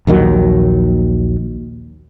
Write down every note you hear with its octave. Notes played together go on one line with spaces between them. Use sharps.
A#1 D#2 D#3 F#3